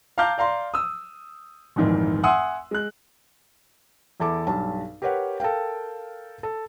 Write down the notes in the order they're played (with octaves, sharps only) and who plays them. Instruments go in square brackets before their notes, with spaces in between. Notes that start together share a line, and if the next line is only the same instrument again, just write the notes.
[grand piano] F5 A5 A#5 D6 F6 G6
D5 F5 A#5 C6
D#6 E6
F1 A#1 G#2 D#3 E3
E5 F#5 G#5 C6 D#6 E6
G#3 F#6
[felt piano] E2 E4 A4 D6
B1 G2 A5
G4 A#4 B4 C#5 F#5
A4 A#4 F5 G5
A4